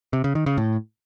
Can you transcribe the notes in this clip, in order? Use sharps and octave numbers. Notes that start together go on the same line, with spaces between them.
C3
C#3
D#3
C#3
A2